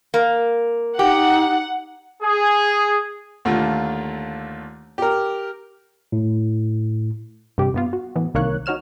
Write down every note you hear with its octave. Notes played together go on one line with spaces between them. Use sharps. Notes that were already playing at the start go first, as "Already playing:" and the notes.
A#3
D#4 G4 F#5
G#4
D#2 D3 A3 F4
G4 A#4
A2
G2 C3 G4
G2 B3 F4
F#4
A2 E3 B3
C2 D#3 A#3 C#5 F#6
D#4 F#4 C#5 F6 E7